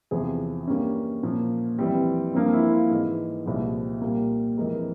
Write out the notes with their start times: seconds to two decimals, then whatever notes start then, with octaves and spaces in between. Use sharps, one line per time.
0.11 E2 C3 F3 G#4
0.67 G2 G3 A#3 C#4
1.23 A#2 F3 A#3
1.79 F2 E3 G3 C4
2.34 G2 F3 A#3 C4
2.53 E4
2.72 F4
2.90 G#2 E3 G#3
3.46 C2 A#2 F3 G#3
4.01 A#2 G3 A#3
4.57 F2 E3 G#3 A#4